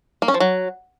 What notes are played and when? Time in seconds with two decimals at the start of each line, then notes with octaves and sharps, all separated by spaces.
0.22 A#3
0.28 C#4
0.34 F3
0.40 F#3